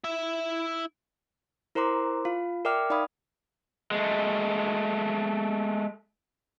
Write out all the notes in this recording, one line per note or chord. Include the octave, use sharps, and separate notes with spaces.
E4 E5
E4 A#4 C5 A#5 C6 D6
F4 F5
A#4 D5 E5 G5 D6 F6
D#4 D5 F5 B5 D#6
G#3 A3